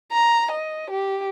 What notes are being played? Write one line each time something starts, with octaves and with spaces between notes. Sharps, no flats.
A#5
D#5
G4